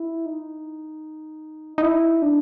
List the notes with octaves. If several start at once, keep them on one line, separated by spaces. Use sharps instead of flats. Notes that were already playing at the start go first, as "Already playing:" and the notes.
Already playing: E4
D#4
D#4
E4
D4